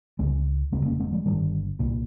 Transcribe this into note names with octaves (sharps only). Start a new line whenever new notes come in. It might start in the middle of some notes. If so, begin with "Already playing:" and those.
C#2 C#3 G#3 C4
F1 D#2 C#3 G#3 C4
A#3 C#4
G#3 C4
F3 G#3
G1 G2 D#3 G3
C2 A#2